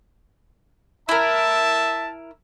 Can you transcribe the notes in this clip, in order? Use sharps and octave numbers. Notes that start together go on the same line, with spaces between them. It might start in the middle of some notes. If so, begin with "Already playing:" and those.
E4 A#4 E5 A5